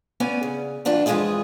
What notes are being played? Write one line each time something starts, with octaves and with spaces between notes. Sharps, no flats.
B3 C#4 D5 G#5
C#3
G2 A#2 E3 D4 F4 F#4
F2 E3 G#3 F4 G#4 D#5